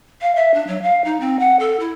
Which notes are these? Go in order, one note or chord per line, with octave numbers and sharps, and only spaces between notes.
F5
E5
D4
F#3
F5
D#4
C4
F#5
A4
E4